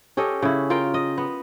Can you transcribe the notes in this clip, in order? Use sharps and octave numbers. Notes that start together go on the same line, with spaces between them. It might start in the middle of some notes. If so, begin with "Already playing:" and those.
C#4 G4 A4 D#5
C#3 E4
F4 A#4 G5
D#5
B3